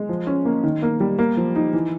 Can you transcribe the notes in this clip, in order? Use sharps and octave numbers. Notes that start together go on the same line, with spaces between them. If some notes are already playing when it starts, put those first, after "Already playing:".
Already playing: G#3
F3
C#4
A#3
D#3
A#3
G3
A#3
F3
D#4
E3